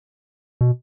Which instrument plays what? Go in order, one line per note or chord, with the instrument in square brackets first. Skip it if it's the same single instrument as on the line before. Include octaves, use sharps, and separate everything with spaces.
[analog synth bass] B2